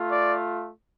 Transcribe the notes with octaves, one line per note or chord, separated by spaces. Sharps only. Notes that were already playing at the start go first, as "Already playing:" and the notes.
Already playing: A3 F4
D5